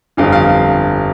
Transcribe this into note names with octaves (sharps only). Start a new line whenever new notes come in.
G1 F2 D3 F5
F5